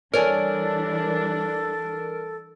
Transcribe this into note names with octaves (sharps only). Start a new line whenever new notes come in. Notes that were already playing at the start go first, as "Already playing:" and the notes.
E3 G3 D4 A4 A#4 C#5 D5 G#5